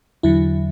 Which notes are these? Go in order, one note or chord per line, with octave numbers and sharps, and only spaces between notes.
E2 D3 F#3 E4